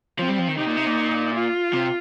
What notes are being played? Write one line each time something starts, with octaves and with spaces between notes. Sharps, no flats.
F3 C4
G3
F3
D#3
C3 D#4
A#2
C3
A#2
F4
C3